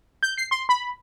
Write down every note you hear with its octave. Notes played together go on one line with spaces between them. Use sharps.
G6
C7
C6
B5